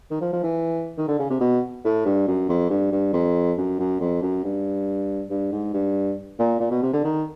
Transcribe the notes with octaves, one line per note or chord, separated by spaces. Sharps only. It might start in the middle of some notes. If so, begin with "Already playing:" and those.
D#3
F3
F3
E3
D#3
D3
C#3
C3
B2
A2
G2
F#2
F2
G2
G2
F2
F#2
F#2
F2
F#2
G2
G2
G#2
G2
A#2
A#2
B2
C3
D3
D#3